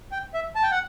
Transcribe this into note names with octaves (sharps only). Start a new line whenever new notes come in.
G5
E5
A5
G5
F#5